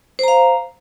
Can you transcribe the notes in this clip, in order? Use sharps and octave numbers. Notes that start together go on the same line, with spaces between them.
C5 F5 A#5